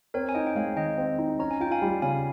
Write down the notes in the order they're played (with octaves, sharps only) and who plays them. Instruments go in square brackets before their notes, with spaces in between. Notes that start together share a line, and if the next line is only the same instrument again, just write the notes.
[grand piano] C4 [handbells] A#4 C#5
[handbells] G#5
[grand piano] D#4 [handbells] D#5 G5
[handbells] G5
[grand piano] G#3 [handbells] C#5 F5
[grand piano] D#3 [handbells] D#5 G5
[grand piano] C4
D#4
[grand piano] C#4 [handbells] A#5
[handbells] G#5
[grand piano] F4 [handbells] G5
[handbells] F5 G#5
[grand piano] G3
[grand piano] C#3 [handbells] F5 G#5